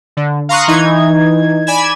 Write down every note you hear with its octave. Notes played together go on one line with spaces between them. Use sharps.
D3
F5 A#5 C6 C#6 D#6 F#6
E3 D#4 G#6
D5 G#5 B5 G#6 E7